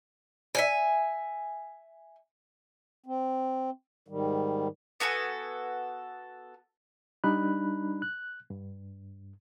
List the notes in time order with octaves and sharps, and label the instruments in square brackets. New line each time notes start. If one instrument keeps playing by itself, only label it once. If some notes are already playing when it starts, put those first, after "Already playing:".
[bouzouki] E5 F#5 G#5
[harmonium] C4
G#2 D#3 G3
[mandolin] B3 F#4 A4 G#5
[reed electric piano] G3 D4 D#4 B5 F#6
F#6
G2